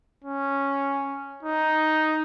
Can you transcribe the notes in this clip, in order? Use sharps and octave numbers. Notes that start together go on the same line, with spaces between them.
C#4
D#4